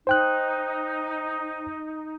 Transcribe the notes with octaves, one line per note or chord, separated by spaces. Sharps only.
D#4 C5 G5 F#6